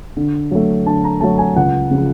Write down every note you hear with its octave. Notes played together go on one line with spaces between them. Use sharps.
D3
F#3 A3
D3 A5
A#5
F#3 A3 A5
G#5
C#2 F#5
C#3 F3 G#3